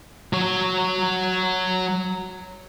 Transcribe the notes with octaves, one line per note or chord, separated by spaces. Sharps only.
F#3 C#5